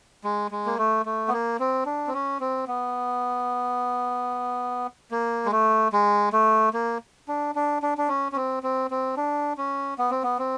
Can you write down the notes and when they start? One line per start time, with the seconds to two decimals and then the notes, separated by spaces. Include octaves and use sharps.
0.24 G#3
0.51 G#3
0.66 A#3
0.78 A3
1.06 A3
1.28 B3
1.33 A#3
1.59 C4
1.86 D4
2.07 C4
2.14 C#4
2.40 C4
2.68 B3
5.11 A#3
5.46 G#3
5.52 A3
5.93 G#3
6.33 A3
6.74 A#3
7.28 D4
7.55 D4
7.82 D4
7.98 D4
8.08 C#4
8.32 C#4
8.36 C4
8.63 C4
8.91 C4
9.17 D4
9.58 C#4
9.98 B3
10.11 C4
10.23 B3
10.38 C4